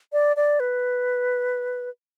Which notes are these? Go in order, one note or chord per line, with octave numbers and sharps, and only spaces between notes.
D5
D5
B4